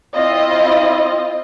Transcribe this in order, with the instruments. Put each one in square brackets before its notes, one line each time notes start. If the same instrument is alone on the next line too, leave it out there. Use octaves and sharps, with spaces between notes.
[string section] C4 E4 F4 D#5